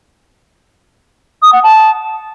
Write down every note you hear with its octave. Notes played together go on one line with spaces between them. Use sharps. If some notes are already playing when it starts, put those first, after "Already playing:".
D#6
F#5
A5